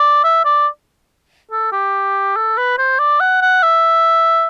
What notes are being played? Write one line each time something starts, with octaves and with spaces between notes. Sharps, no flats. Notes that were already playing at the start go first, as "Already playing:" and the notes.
Already playing: D5
E5
D5
A4
G4
A4
B4
C5
D5
F#5
F#5
E5